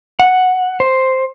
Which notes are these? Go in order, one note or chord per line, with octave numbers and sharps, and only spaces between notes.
F#5
C5